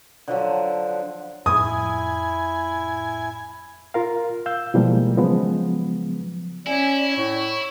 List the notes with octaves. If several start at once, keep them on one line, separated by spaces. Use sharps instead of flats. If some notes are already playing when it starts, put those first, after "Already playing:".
D3 F3 F#3
F2 A2 E4 G#5 D#6
F4 A#4 F5
F5 E6 G6
B2 E3 F3 G3 G#3 A#3
C#3 F3 F#3 G#3 B3
C#4 E4 D5 G#5
A2 C#6